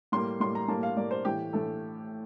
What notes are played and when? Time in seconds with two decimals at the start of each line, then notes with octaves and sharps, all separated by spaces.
0.12 A2 G3 A#3 C6
0.40 A2 G3 A#3 C6
0.55 A#5
0.68 A2 G3 A#3 A5
0.83 F5
0.96 A2 G3 A#3 D5
1.11 C5
1.25 A2 E3 A3 G4
1.53 A2 E3 A3 A4